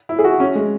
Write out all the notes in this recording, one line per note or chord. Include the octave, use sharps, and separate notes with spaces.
E4
G#4
F#4
C#4
G#3